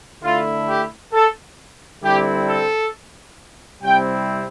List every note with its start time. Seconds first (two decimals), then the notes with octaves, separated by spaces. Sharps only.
0.23 D3 A3 E4 F4
0.68 G4
1.13 A4
2.03 D3 G3 C4 E4 G4
2.47 A4
3.83 C3 G3 C4 E4 G5